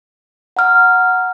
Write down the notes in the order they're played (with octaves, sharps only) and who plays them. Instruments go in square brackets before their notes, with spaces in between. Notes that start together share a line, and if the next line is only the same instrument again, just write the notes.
[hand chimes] F#5 A#5 F6